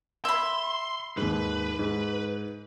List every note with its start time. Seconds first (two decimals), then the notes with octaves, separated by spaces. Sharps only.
0.25 E5 B5 C6
1.17 D#2 G#2 B4
1.79 G#2